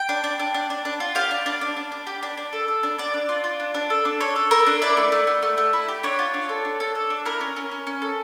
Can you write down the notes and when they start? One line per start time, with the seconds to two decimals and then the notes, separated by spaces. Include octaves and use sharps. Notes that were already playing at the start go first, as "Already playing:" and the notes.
Already playing: G5
0.09 D4
0.24 D4
0.39 D4
0.54 D4
0.70 D4
0.85 D4
1.00 F4
1.15 G4 F5
1.31 D4
1.46 D4
1.61 D4
1.76 D4
1.92 D4
2.07 G4
2.23 D4
2.38 D4
2.53 A4
2.68 A4
2.83 D4
2.98 D4 D5
3.14 D4
3.29 F4
3.44 F4
3.60 D4
3.74 D4
3.90 A4
4.05 D4
4.20 A4 C#5
4.36 A4
4.51 A4 A#4
4.66 D4
4.82 E4 D5
4.97 A3
5.12 A3
5.27 A3
5.43 A3
5.58 A3
5.73 E4
5.88 G4
6.03 D4 C#5
6.19 F4
6.34 D4
6.49 A4
6.65 D4
6.80 A4
6.95 A4
7.10 D4
7.25 E4 A#4
7.41 C#4
7.56 C#4
7.71 C#4
7.87 C#4
8.02 A4